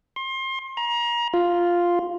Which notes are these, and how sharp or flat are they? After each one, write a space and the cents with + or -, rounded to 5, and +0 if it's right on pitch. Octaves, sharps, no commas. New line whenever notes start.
C6 +30
A#5 +30
F4 +0